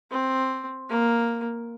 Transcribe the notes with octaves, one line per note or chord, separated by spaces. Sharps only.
C4
A#3